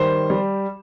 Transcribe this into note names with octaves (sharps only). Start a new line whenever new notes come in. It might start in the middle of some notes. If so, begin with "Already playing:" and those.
Already playing: D#3 G3 C5
G3